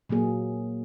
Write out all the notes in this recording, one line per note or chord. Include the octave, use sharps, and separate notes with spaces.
A#2 F#3 A#3 G#4